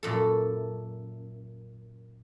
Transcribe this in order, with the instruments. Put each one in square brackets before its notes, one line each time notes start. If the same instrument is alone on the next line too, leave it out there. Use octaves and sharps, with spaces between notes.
[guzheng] F#2 A#2 A4